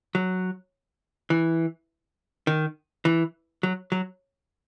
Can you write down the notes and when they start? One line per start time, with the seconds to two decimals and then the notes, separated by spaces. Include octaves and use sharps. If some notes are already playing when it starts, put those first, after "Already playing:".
0.15 F#3
1.30 E3
2.47 D#3
3.05 E3
3.63 F#3
3.92 F#3